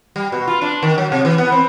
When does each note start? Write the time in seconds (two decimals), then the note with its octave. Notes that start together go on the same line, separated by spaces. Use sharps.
0.16 G3
0.32 B2
0.47 F4
0.62 D4
0.83 D#3
0.98 F#3
1.12 C3
1.25 E3
1.38 B3
1.52 C4